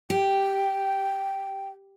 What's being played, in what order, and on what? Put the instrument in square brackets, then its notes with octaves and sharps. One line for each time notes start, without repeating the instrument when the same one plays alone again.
[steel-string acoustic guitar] G4 [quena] G5